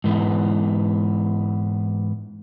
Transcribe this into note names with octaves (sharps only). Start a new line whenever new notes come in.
G#2 E3 B3